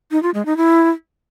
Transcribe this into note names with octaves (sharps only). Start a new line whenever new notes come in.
D#4
F4
G#3
D#4
E4